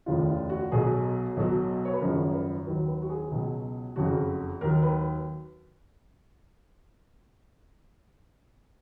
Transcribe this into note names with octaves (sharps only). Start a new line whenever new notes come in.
F1 D#2 C#3 F3 F4
F4
F#4
B1 B2 F#3 G#4
B1 B2 F#3
C#5
B4
G#1 F#2 C#3 F3 A#4
B4
D#2 D#3 F#3 B4
B4
F#4
G#4
C#2 B2 F#3
F#1 F2 C#3 F#3 F#4
D#2 D#3 F#3 A#4
B4